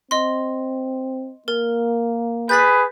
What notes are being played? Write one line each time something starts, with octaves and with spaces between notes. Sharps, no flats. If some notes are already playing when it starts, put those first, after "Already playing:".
C4 D#5 C6
A#3 A#4
G#4 B4 G6 A6 B6